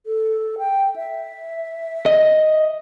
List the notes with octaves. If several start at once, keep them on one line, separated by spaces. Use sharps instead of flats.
A4
G5
E5
D#5